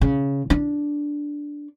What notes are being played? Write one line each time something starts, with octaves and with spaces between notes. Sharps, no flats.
C#3
D4